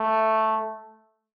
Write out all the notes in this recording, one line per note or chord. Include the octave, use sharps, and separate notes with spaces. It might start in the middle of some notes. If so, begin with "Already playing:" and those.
Already playing: A3